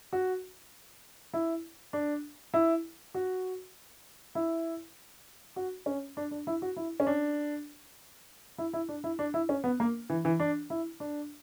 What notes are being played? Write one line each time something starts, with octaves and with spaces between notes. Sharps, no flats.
F#4
E4
D4
E4
F#4
E4
F#4
C#4
D4
D4
E4
F#4
E4
C#4
D4
E4
E4
D4
E4
D4
E4
C#4
B3
A#3
E3
E3
D4
E4
D4